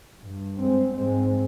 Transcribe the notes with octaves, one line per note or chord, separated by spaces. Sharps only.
G2
G#3 C4
G#2 G#3 C4